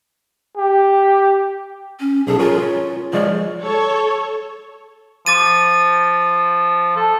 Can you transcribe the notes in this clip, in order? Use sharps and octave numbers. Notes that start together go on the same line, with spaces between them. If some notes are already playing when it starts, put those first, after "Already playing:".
G4
C#4
B1 G#4 A4
F4 G#4 A#4 C#5
C#4
F3 G#3 C#5 D5
A4 C#5
F3 D6 A6 D#7
A4